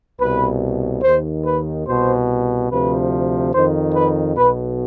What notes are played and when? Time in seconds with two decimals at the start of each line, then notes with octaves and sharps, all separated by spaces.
0.20 C2 B2 B4
1.03 D#2 D#3 C5
1.45 B4
1.87 C2 B2 C5
2.71 D2 C3 F3 B4
3.53 F2 D#3 C5
3.95 B4
4.37 B1 B2 B4